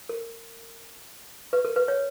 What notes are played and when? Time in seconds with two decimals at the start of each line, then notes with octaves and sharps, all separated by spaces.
0.09 A#4
1.53 B4
1.65 A#4
1.76 B4
1.88 C#5